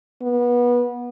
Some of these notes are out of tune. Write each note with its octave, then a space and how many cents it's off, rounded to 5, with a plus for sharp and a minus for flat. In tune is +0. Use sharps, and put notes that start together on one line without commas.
B3 -25